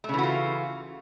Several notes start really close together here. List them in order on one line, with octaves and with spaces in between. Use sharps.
A3 C#3 E3 F#4 F4